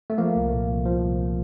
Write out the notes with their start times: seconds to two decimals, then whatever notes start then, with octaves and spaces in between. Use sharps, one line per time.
0.10 A3
0.18 F3 A#3
0.36 C2
0.52 A#2
0.68 C2
0.85 F3
1.03 C2